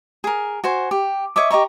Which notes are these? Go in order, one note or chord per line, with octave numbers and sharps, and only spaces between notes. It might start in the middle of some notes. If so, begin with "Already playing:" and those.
G#4 A#4
F#4 C5 G#5
G4
C#5 D#5 E5 D6
G4 D#5 A#5 C#6